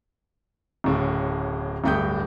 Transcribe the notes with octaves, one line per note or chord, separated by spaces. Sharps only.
D1 A2 C#3
D1 G2 A3 G5 D#6 G6